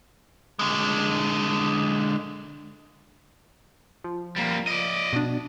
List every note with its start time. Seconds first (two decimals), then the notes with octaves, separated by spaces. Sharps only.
0.59 D3 G#3
4.04 F3
4.36 G3 A#3
4.67 D5 D#5
5.13 B2 D4